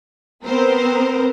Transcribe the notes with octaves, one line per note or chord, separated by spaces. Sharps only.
B3 C4 A#4 C5